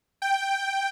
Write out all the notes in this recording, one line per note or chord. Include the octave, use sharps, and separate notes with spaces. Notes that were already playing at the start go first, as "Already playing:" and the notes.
G5